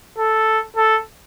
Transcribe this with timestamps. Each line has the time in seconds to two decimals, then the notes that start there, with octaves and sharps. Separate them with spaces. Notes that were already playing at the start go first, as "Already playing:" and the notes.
0.19 A4
0.77 A4